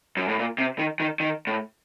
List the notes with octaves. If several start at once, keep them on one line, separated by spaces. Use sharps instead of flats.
F#2
A2
A#2
C3
D#3
D#3
D#3
A2